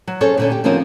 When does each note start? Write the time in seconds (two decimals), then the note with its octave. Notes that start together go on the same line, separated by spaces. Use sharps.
0.07 F#3
0.21 C#4 G#4 A4 C5 C#5
0.38 A#2 D3 C#4
0.52 G4
0.64 D3 F3 C4 C#4 D#4 A#4